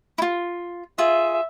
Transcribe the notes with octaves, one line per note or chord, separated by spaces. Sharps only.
E4 F4
F4 G#4 E5